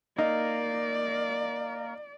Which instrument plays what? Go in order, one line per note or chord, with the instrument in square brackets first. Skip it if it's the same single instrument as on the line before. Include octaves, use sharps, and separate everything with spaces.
[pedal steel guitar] A#3 [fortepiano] D#4 [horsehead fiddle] D5